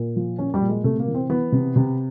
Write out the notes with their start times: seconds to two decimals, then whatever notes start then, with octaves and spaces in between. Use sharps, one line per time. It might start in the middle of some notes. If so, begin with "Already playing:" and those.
Already playing: A#2
0.16 F3
0.38 F3 C#4
0.54 G3
0.61 A#2
0.69 G#3
0.84 C3 A3
1.00 A#3
1.08 E3
1.15 C4
1.29 E3 B3
1.52 C3
1.76 C3